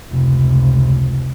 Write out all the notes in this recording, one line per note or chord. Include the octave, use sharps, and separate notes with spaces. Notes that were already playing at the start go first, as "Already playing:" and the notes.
F1 C#2